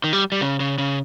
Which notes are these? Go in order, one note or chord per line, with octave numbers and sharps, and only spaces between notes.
D#3
G3
G3
C#3
C#3
C#3